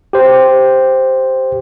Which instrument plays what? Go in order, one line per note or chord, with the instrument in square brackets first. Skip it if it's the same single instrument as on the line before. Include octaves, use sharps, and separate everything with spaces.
[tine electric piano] G4 C5